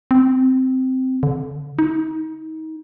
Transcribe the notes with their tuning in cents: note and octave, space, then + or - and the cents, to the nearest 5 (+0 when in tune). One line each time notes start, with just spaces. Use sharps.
C4 -10
D3 -30
D#4 +30